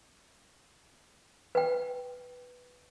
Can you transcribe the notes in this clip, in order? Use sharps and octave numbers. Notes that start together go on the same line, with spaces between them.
B4 G5